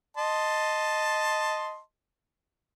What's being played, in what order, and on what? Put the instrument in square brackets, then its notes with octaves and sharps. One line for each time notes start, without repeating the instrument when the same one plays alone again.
[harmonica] D#5 A5 C6